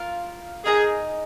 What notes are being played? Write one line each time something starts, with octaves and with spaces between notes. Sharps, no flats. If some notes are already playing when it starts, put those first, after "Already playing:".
Already playing: F4 A#4 F5
D#4 G#4 A#4 D#5 G#5